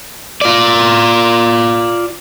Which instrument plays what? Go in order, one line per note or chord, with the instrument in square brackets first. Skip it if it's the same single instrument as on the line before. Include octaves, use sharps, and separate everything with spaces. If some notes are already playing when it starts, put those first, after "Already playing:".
[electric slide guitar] F4 D5